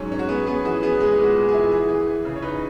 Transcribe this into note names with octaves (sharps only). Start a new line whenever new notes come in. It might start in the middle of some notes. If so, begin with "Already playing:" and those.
Already playing: G#2 F#3 C#4
C#4
F#4
B3 G#4
B3 G#4
E3 F#4
B3 G#4
G#3 G#4
A#2
F#4
A#2
E4 G#4
E3 G#4
E3
E3
C#3
C#5
D#4 B4